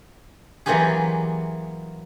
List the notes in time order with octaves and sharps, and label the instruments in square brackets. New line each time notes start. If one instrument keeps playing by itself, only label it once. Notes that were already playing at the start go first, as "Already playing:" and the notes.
[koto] E3 F#3 A#3 F4 G4 G#4